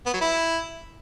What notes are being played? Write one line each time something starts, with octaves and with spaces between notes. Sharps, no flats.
B3
F#3
E4